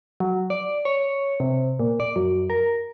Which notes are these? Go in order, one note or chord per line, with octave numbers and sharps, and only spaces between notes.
F#3
D5
C#5
C3
A#2
D5
F#2
A#4